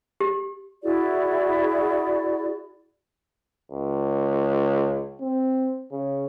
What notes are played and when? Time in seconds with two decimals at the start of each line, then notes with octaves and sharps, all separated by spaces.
0.21 G4
0.83 E4 F#4 G#4 D5
3.72 C#2
5.21 C4
5.92 C#3